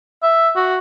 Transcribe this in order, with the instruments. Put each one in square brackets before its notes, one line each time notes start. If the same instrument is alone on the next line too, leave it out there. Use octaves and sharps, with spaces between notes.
[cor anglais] E5
F#4